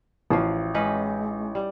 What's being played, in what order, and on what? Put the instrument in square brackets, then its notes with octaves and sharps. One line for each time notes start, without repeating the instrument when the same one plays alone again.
[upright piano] A1 [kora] F3 F4 F#4
[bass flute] G#3 [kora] C#4 D#4 B4
[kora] G3